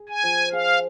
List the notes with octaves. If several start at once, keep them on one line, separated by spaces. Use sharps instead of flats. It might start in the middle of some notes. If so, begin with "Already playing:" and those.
Already playing: G#4
G#5
F3
G#4 F5